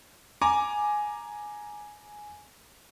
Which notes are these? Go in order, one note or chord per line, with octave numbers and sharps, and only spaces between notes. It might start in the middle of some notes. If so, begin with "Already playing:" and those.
G#5 A#5 D6